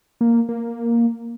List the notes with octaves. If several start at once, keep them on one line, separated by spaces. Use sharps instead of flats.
A#3
A#3